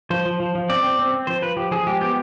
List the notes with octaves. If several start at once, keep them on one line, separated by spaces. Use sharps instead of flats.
F3 C5
F3
F3
F3
C4 D5
C4
C4
C4
F3 C5
F3 B4
F3 G4
F3 G#4
G#3 G4
B3 G4